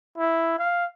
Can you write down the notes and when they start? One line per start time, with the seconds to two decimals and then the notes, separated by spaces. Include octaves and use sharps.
0.18 E4
0.59 F5